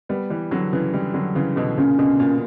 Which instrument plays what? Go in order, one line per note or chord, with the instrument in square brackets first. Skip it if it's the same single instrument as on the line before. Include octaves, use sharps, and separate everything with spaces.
[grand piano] G3 B3
E3 G3
D3 F#3
C#3 E3
E3 G3
D3 F#3
C#3 E3
B2 D3
[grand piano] A#2 C#3 [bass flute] C#4
[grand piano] B2 D3
A#2